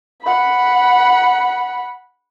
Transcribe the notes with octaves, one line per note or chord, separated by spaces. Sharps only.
F#5 B5